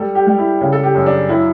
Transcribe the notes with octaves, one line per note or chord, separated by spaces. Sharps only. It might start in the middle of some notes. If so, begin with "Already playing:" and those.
Already playing: G3 A4
G4
G3
E4
C#3
A4
G4
F#2
D4
F#3 E4